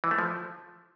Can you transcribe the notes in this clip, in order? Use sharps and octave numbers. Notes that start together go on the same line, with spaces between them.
E3
A3
F3